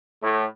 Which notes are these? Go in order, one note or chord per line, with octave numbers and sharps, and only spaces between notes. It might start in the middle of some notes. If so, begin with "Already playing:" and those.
A2